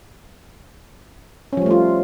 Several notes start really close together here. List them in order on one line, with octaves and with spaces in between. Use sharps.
C#4 F3 G3 A3 F4